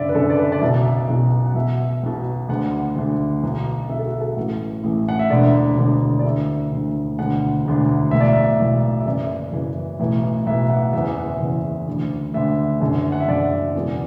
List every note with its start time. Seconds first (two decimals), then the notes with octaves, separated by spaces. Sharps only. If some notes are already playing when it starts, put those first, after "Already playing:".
Already playing: F#1 F#2 D3 D5 E5
0.09 B4
0.14 F#1 F#2 D3 A4
0.30 D5
0.39 B4
0.52 D5
0.61 B1 B2 E5
1.09 B1 B2
1.46 F#5
1.55 B1 B2 E5
2.03 B1 B2
2.49 D2 D3 F#5
2.96 D2 D3
3.43 B1 B2
3.89 B1 B2 E5
3.99 A4
4.06 F#4
4.21 A4
4.37 A1 A2 E3
4.84 A1 A2 E3
5.08 F#5
5.19 E5
5.30 E1 D2 D3 D5
5.77 E1 D2 D3
6.19 D5
6.25 D2 D3 E5
6.72 D2 D3
7.18 E1 D2 D3 F#5
7.65 E1 D2 D3
8.11 B1 A2 E3 E5
8.20 D5
8.28 E5
8.59 B1 A2 E3
9.00 E5
9.06 F#1 F#2 E3 D5
9.52 F#1 F#2 E3
9.99 B1 A2 E3
10.46 B1 A2 E3 E5
10.70 F#5
10.93 F#1 E2 E3 E5
11.16 F#5
11.40 F#1 E2 E3
11.87 D2 D3
12.34 D2 D3 E5
12.80 F#1 F#2 D3
13.12 F#5
13.20 E5
13.28 F#1 F#2 D3 D5
13.75 E1 E2 B2